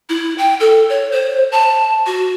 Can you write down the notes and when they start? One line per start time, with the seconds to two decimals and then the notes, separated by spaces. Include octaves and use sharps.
0.09 E4
0.38 G5
0.60 A4
0.89 C#5
1.12 C5
1.52 A5
2.06 F#4